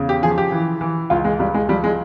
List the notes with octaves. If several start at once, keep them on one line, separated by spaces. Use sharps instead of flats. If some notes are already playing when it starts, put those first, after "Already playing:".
Already playing: E2 C#3
G4
F3 G#4
G4
E3
E3
C#2 F4
G#3
C#2 G3
G#3
F3 G3
G#3